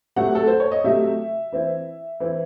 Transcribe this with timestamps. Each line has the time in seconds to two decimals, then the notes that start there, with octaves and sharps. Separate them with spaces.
0.16 C3 F#3 A3 F#5
0.35 A4
0.47 C5
0.60 C#5
0.72 D#5
0.84 C3 F#3 A3 E5
1.52 E3 C4 E4
2.20 E3 C4 E4